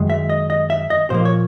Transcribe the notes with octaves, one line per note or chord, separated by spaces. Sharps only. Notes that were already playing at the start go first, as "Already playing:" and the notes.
Already playing: F#2 D#3 G#3
E5
D#5
D#5
E5
D#5
A#2 F3 A#3 C5
C#5